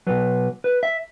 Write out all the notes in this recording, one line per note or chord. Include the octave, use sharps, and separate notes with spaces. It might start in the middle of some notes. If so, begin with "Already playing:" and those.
B2 F#3 B4
B4
E5